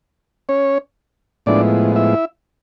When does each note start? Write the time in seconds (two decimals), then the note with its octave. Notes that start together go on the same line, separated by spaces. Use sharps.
0.49 C#4 C#5
1.46 A2 F3 G#3 B3 D4 E4 D5
1.96 E4 E5